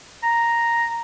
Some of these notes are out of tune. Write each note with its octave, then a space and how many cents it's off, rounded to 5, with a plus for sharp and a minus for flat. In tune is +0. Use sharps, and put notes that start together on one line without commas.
A#5 +0